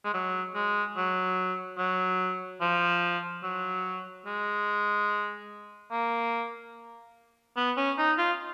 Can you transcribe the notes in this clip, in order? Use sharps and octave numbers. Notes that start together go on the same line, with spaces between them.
G#3
F#3
G#3
F#3
F#3
F3
F#3
G#3
A#3
B3
C#4
D#4
F4